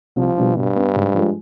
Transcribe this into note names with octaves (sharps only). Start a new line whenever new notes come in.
C2 F3
B2 G3 D4
G2 B2
B3 D4
G#2
F3 G#3